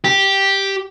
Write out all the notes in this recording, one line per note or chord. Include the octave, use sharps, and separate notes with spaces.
G4